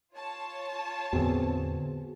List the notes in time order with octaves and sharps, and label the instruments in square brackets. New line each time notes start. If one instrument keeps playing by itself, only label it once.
[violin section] F4 C#5 A5
[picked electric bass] E2 A2 D3 [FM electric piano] B3 C4 G#4 [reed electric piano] F#4